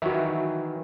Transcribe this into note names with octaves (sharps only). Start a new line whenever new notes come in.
D#3 E3 F#3 F#4 E5